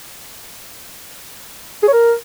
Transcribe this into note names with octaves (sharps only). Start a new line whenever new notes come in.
G#4
C#5
A#4